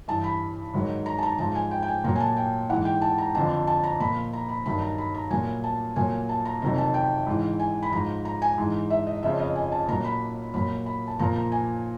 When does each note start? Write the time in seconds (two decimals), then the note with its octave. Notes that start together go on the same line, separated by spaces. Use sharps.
0.08 G2 E3 A5
0.24 B5
0.74 G#2 D#3 F#3
1.06 A#5
1.18 A5
1.23 A#5
1.39 G#2 F3 A5
1.55 G#5
1.71 G5
1.82 G5
1.88 G#5
2.04 A#2 A#5
2.07 F#3
2.16 G#5
2.20 A5
2.37 G5
2.69 E3 F#5
2.73 G#2
2.85 G5
3.02 A5
3.18 A#5
3.35 F2 D3 F3 A5
3.67 A5
3.84 A#5
4.00 A#2 F3 B5
4.33 A#5
4.49 B5
4.66 G2 D#3 F#3 B5
4.82 A#5
4.98 B5
5.14 A#5
5.31 A#2 F#3 G#5
5.64 A5
5.96 A#2 F#3 G#5
6.29 A5
6.45 A#5
6.62 F2 C3 D#3 F#3 A#5
6.78 A5
6.94 G5
7.27 G#2 E3
7.60 G#5
7.83 B5
7.92 G#2 F3 A#5
8.25 A#5
8.42 G#5
8.58 G#2 E3
8.90 E5
9.07 D#5
9.23 F2 C#3 F3 E5
9.39 D#5
9.55 G#5
9.72 A5
9.88 A#2 A#5
9.92 F#3
10.04 B5
10.54 A#2 F#3 B5
10.86 B5
11.07 A5
11.19 A#2 F3 A#5
11.36 A#5
11.52 G#5